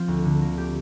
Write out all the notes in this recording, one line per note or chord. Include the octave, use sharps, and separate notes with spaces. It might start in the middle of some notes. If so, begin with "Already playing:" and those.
Already playing: F3 C4 F4
D2
D3
A#3
G4